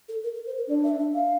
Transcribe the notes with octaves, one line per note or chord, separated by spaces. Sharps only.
A4
A#4
A#4
C5
A#4
D4 D5
E5
E5
F5